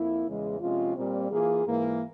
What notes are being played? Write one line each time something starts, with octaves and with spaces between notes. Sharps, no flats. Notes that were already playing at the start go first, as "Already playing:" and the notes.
Already playing: F2 A#3 E4
E2 C#3 E3 G#3
C3 F3 G#3 C#4 F4
A#2 G3 C4
E3 A#3 F4 G#4
G#2 E3 A#3